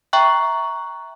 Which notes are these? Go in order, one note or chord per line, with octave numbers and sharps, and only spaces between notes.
E5 G5 A#5 C#6 F#6